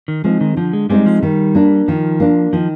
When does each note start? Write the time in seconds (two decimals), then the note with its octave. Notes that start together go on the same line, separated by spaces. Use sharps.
0.08 D#3
0.24 F3 G#3 C4 D#4
0.41 D#3
0.57 D3 F3
0.73 G#3
0.90 G3 G#3 C4 D#4
1.06 F3
1.22 D#3 G3
1.55 A#3 D4
1.88 D#3 F3
2.20 A#3 D4
2.53 D#3 F3